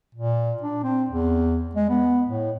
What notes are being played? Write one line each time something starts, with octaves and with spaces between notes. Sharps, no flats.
A#2
D4
C4
E2
G#3
B3
A2